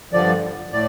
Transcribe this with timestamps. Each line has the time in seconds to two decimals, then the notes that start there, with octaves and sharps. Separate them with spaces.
0.13 G2 D3 F3 D5
0.72 A2 D5